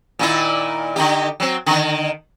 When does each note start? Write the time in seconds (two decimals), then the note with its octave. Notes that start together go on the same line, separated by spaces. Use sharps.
0.19 A#2 D#3 E4
0.96 D3 D#4 G4
1.40 F#3 C4
1.66 D3 D#3